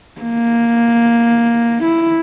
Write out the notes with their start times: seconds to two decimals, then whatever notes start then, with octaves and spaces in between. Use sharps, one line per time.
0.21 A#3
1.84 E4